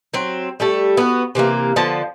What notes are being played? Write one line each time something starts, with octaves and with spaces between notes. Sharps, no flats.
F#3 C4
G3 A3 A4
B3 F#4
C3 E3 A3 A#3
D3 F3 B3 A5